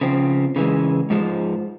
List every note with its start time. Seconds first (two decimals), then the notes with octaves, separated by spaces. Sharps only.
0.01 C#3 F3 C4
0.56 C#3 E3 G#3
1.10 G#2 F3 G#3